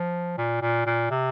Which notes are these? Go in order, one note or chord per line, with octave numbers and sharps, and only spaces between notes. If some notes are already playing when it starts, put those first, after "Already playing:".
Already playing: F3
A#2
A#2
A#2
C3